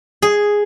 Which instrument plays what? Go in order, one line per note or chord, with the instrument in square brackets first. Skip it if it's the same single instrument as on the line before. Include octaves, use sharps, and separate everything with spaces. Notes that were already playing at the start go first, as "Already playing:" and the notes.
[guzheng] G#4